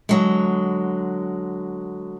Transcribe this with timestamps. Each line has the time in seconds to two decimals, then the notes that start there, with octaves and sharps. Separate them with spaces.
0.09 D3 F#3 G#3